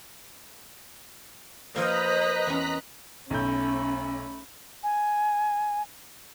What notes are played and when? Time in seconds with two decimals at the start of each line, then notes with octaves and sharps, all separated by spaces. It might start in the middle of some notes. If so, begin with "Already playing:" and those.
1.76 F3 A#3 B4 C5 D#5 A#5 F#6 B6
2.47 E2 C4 C#4
3.30 B1 A3 C#4 B5 G6
4.83 G#5